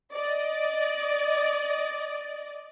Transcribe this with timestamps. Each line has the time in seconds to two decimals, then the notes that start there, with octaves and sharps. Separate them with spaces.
0.14 D5 D#5